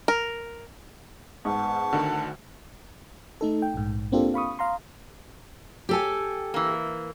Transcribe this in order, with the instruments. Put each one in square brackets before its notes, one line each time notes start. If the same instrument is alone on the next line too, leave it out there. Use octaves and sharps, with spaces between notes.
[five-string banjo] A#4
[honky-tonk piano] G#2 [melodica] B3 C#6 [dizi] A5
[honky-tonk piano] D2 [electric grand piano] D3 D#3 F#5
[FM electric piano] A3 D#4 A4
G5
A#1 G#2
A#3 C4 D4 F4 G4 A4
F5 B5 C#6 D#6
F5 A#5 C6
[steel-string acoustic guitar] G4 A4 G#5
[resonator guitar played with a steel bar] E3 A#3